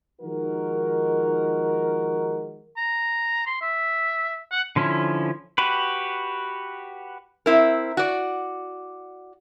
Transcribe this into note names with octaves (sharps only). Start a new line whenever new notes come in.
D#3 F3 G#3 D#4 F#4 A#4
A#5
C6
E5
F#5
D3 F3 C#4 E4
F#4 G4 B4
C4 E4 A#4
F#4 D5